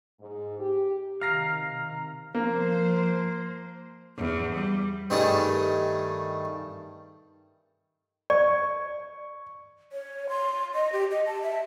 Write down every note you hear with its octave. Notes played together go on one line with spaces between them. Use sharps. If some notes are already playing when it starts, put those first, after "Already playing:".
G#2
G4
C3 D#3 F5 A#5 F6 A#6 C7
F3 A#3 C5
E2
G3
G2 D#3 G3 A3 G#4
D5 C#6
C#5
C6
D#5
G4
D#5
A5
E5